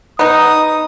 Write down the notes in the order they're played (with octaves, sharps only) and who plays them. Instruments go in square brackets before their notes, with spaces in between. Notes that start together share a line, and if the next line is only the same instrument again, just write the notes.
[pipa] B3 D#4 [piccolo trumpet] D#6